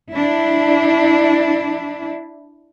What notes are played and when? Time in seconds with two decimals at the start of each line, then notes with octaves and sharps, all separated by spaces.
0.14 D4 E4